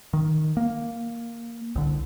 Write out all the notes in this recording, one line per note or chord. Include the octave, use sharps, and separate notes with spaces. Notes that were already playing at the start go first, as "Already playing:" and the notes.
D#3
A#3
C2 D3